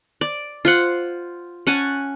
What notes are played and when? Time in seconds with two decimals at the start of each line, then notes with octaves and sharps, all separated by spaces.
0.21 D5
0.65 F4 C5 F#5
1.67 C#4 F#5 G#5 A5